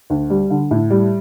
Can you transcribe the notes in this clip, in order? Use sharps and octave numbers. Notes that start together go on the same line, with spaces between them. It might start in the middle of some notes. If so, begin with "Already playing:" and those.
D2
G3
D3
A2
G3